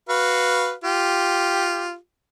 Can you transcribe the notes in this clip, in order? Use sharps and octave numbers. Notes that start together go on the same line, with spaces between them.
F#4 B4 F5
F4 G4